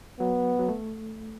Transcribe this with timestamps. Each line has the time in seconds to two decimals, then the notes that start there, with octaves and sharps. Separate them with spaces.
0.20 F#3 B3
0.59 F#3
0.68 A3